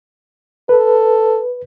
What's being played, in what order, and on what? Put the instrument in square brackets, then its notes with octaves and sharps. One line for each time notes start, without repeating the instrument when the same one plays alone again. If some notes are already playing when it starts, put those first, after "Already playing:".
[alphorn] A4 [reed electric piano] B4